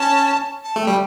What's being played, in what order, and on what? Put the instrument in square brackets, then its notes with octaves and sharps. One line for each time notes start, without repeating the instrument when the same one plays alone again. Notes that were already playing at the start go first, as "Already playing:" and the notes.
Already playing: [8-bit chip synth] C#4 [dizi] A5
[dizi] A5
[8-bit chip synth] A3
[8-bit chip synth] G3 [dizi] G5